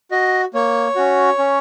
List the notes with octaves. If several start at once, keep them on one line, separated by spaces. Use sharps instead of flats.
F#4 D#5
A#3 C#5
C#4 F#4
C#4